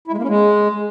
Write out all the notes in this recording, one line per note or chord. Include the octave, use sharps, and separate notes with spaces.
E4
G#3
A#3
C#4
G#3